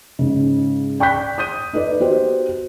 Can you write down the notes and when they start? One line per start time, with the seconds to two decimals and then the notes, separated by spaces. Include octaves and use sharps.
0.19 G#2 C#3
1.00 D5 G5 C#6 F#6 G6 B6
1.38 D#6 G6 D#7
1.73 D#4 A4 B4 D5 D#5
2.00 B3 F#4 G4 C5